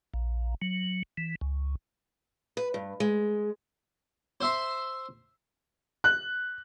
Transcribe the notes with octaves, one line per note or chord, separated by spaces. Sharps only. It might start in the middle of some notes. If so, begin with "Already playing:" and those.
A#1
F#3
E3
C#2
B4
G2
G#3
C5 E5 C6
F#6